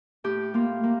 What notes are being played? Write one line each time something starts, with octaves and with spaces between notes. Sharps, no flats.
A2 G4
A#3 F4
A#3